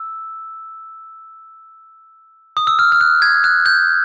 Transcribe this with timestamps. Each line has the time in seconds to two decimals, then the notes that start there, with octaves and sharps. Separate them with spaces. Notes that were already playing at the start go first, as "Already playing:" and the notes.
Already playing: E6
2.57 D#6
2.67 E6
2.79 F6
2.92 F6
3.01 F#6
3.22 G#6
3.44 F#6
3.66 G6